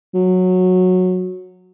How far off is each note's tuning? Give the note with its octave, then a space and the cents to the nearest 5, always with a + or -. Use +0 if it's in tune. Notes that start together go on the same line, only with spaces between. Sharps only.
F#3 -15